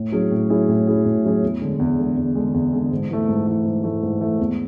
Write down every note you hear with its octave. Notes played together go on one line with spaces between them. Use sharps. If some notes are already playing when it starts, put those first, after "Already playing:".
Already playing: A2
F#3 C#4 E4 G#4
A2
F#3 C#4 E4 G#4
A2
F#3 C#4 E4 G#4
A2
F#3 C#4 E4 G#4
E2
D3 G#3
E2
D3 G#3
E2
D3 G#3
E2
D3 G#3
G#2
E3 A3
G#2
E3 A3
G#2
E3 A3
G#2
E3 A3
E2